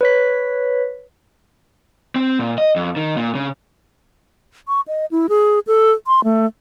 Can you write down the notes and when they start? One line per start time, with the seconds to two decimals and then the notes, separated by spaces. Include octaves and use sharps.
0.01 B4 C#5 B6
2.16 C4
2.39 A#2
2.58 D#5
2.76 F2
2.96 D#3
3.17 A#2
3.35 C#3
4.68 C#6
4.88 D#5
5.11 E4
5.29 G#4
5.67 A4
6.07 C6
6.24 A3